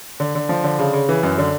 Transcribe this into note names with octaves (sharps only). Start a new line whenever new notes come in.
D3
D3
F3
D3
C#3
C#3
E3
F#2
D3